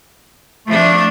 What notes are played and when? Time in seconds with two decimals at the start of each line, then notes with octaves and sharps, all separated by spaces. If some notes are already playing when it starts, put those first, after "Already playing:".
0.67 F3 A3 D4